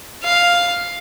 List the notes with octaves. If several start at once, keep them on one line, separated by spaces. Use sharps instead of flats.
F5